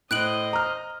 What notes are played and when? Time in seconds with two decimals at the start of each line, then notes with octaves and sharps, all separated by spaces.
0.11 A2 C5 D#5 F#6 D7 F#7
0.53 A#5 F6